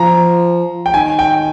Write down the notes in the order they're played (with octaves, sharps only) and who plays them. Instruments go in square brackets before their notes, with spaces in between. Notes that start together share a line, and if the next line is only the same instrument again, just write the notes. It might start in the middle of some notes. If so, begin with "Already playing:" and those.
Already playing: [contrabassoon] F3 [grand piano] A#5
[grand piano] G5
[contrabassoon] D#3 [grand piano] G#5
[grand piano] G5